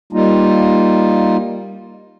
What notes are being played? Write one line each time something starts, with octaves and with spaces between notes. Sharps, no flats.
G3 A#3 D#4 F4